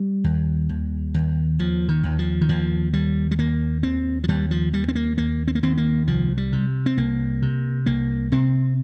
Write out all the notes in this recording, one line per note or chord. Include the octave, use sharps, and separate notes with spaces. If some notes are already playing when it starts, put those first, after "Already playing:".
Already playing: G3
D#2
D#2
D#2
D#2 F3
D#3
D#2
F3
D#3
D#2 F3
D#2 G3
G3
D#2 A#3
D#2 C4
F3
D#2 G3
F3
D#2 G3
C4
A#3
D#2 A#3
C4
A#3
D#2 C4
A#3
C2 F3
G3
C3
C4
C2 A#3
C3
C2 A#3
C3 C4